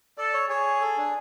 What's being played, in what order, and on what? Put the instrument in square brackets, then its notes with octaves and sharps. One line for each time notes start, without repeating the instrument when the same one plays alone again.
[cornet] A4 [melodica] D5
[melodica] C#5
[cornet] G#4 [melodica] C#5
[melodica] A4
D4